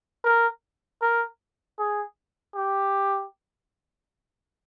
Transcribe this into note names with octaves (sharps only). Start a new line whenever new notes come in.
A#4
A#4
G#4
G4